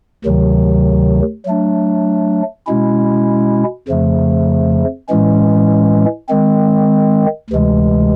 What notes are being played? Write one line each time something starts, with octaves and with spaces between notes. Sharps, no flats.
D2 C3 D#3 F#3
F#3 A3 D4
B2 G#3 C#4 E4
F2 C#3 F3 A3
A2 E3 G#3 C#4
D#3 G#3 C4
D2 C3 E3 G#3